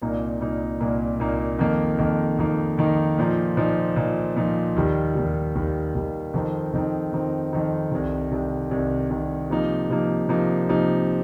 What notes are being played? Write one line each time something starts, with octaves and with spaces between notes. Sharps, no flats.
C2 A#2 A#3 D#4
C2 A#2 A#3 D#4
C2 A#2 A#3 D#4
C2 A#2 A#3 D#4
F2 D#3 A#3 D#4
F2 D#3 A#3 D#4
F2 D#3 A#3 D#4
F2 D#3 A#3 D#4
A#2 F3 D#4
A#2 F3 D#4
A#2 F3 D#4
A#2 F3 D#4
D#2 D#3 G3
D#2 D#3 G3
D#2 D#3 G3
D#2 D#3 G3
F2 D#3 C4 D#4
F2 D#3 C4 D#4
F2 D#3 C4 D#4
F2 D#3 C4 D#4
C2 C3 D#3
C2 C3 D#3
C2 C3 D#3
C2 C3 D#3
C3 F3 A#3 D#4
C3 F3 A#3 D#4
C3 F3 A#3 D#4
C3 F3 A#3 D#4